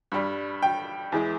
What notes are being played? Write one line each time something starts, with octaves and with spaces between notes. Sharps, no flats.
G2 G3
G5
E2 E3 G#3